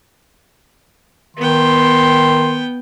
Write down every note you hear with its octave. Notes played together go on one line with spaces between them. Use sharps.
D#3 B3 G5 C6